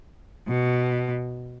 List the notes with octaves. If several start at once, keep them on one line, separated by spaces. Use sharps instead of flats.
B2